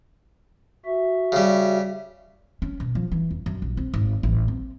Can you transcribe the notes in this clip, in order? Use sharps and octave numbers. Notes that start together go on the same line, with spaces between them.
F#4 E5
C#3 G3
C#4
B2
F3
E3
E2
F#2
A#1
C4
G#1
A1
C4